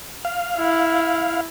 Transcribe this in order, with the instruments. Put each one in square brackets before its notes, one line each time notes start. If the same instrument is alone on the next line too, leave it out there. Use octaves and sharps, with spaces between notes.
[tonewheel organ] F5
[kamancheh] E4